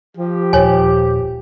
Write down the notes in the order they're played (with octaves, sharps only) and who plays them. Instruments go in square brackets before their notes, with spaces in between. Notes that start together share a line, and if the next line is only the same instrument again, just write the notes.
[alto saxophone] F3 [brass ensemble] G4
[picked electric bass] D#1 [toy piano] C#5 G#5